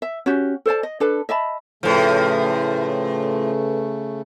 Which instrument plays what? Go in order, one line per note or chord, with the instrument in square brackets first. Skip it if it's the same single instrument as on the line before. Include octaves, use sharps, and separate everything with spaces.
[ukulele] E5
C#4 F#4 G4
A4 C5 D5 A5
D#5
D4 A4 B4
D#5 E5 A5 B5
[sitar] A2 F3 [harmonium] C#3 A3 [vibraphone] A4 B4